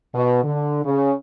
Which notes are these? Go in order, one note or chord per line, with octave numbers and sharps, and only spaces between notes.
B2
D3
C#3